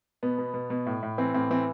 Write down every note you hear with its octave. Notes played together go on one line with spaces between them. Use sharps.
B2 B3
B2
B2
B2
A2
A2
E3 C4
A2 C4
E3 C4